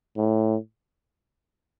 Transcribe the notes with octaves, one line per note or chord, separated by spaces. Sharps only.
A2